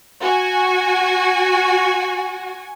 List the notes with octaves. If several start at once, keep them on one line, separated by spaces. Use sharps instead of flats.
F#4 G#5